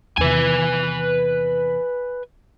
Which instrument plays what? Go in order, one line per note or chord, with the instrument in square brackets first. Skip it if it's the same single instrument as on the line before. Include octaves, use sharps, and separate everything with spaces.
[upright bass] E2 C3 [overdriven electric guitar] B4 G#5